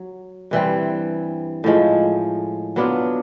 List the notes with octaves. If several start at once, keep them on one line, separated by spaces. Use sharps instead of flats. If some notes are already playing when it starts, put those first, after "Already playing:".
Already playing: F#3
G2 E3 G3 C4
A2 F3 G#3
F#3 B3 D4 F4